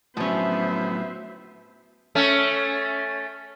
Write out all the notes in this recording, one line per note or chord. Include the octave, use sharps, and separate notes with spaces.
A2 F3 F#3 B3 C#4 C5 E5
A3 C#4